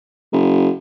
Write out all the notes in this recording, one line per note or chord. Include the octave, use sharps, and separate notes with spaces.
F#1